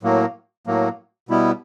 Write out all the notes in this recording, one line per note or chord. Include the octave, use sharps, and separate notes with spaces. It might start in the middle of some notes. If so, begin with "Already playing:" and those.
A2 F#3 A#3
A2 F#3 A#3
B2 G3 B3 E4